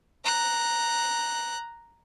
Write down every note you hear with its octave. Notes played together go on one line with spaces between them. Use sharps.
A#5 F#6